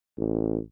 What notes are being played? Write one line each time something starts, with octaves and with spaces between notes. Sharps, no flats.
A1